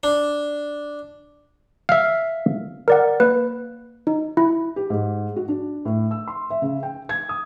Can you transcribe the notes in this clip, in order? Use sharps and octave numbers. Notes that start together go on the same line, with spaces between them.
D4
E5 F5
A#4 D5 F#5
A#3 B4
D#4
E4
G4
G#2
F#4
D4
A2
E6
C6
E5
C#3
G5
G#6
D#6